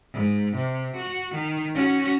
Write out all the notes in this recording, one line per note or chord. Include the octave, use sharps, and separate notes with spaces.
G#2
C3
F#4
D#3
C#4 F#4